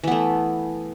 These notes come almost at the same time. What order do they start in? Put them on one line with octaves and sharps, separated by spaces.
E3 B3 A3